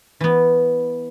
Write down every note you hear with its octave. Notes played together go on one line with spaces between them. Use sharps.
E3 B3